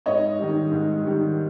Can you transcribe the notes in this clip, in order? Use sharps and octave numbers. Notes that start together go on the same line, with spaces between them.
G#2 C#5 D#5
D#3 G3
G#2
D#3 G3